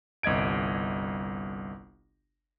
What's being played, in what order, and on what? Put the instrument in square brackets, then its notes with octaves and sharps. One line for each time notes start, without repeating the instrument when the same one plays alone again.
[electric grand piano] G1 C2 D#5 G#6 D7